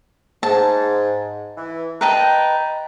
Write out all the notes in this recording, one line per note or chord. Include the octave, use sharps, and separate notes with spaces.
G#2 A5
E3
B4 D#5 G5 A5 A#5